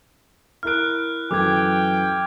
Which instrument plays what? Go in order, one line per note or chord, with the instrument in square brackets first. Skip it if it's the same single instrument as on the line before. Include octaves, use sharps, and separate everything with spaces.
[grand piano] E4 A#4 D7 [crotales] F6 F#6
[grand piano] F#2 E3 A4 [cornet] G5 [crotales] D6 G#6